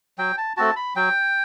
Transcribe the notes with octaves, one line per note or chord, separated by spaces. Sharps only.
F#3 G5
A5
A3 C4 F#4 A5
B5
F#3 G5